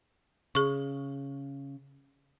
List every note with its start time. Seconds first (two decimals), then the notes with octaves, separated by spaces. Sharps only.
0.55 C#3 G#4 C#6